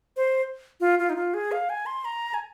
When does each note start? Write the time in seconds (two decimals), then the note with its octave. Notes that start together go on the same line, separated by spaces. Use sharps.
0.17 C5
0.80 F4
0.99 F4
1.10 D#4
1.16 F4
1.34 G#4
1.52 F5
1.69 G#5
1.86 C6
2.05 A#5
2.34 G#5